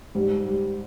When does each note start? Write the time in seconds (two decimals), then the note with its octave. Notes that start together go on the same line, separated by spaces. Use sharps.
0.15 G#2 G3
0.44 G3